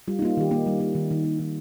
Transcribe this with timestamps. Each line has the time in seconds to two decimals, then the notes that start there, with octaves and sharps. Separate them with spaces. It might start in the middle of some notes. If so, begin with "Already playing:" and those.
0.08 G3 F4
0.19 D#4
0.22 A#3 F4
0.30 D#4
0.37 D#3 G4
0.51 A#3 D#4
0.66 G3
0.80 A#3
0.95 D#3
1.11 D#3
1.24 A#3
1.39 D#3